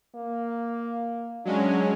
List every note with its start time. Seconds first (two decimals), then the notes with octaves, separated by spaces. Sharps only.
0.15 A#3
1.45 F#3 G#3 C#4 D4